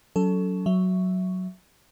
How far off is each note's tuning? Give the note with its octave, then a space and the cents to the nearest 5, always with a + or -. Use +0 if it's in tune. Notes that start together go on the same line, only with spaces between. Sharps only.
F#3 +0 C#4 +40 A4 +0
F#3 +0 E5 +0